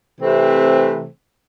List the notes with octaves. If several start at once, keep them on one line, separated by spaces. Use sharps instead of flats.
C3 E3 A3 C4